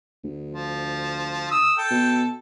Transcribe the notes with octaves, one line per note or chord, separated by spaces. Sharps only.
D2
F3
D#6 E6
A4 G5
B2